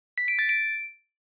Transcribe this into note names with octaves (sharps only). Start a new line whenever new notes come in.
B6
D7
A6
D7